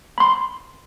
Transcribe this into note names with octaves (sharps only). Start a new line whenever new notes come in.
B5 C6